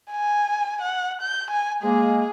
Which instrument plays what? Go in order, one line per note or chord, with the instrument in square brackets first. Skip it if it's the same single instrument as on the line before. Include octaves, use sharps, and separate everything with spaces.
[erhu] G#5
F#5
G6
G#5
[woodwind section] G#3 A#3 [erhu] G#4